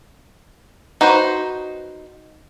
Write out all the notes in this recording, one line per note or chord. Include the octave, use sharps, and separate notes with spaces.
D#4 F#4 B4 C5